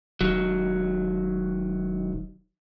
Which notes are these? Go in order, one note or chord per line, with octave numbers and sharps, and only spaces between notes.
E1 D#3 F#3